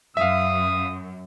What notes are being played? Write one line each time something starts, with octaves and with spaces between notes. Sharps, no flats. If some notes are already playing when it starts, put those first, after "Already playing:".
F#2 E5 F5 D#6